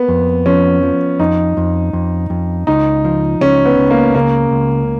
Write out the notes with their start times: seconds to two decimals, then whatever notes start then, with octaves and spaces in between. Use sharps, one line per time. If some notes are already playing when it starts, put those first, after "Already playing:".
Already playing: A#3 B3
0.08 F2
0.46 F3 C#4
0.83 F3
1.19 F2 D#4
1.57 F2
1.93 F2
2.30 F2
2.67 C#2 D#4
3.05 F3
3.41 C#2 C#4
3.65 B3
3.78 C#2
3.90 A#3
4.15 C#3 A#3
4.52 C#2